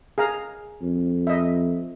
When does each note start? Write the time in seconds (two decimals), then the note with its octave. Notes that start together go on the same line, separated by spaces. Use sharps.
0.18 G#4 F5 A#5
0.82 F2
1.27 D#5 E5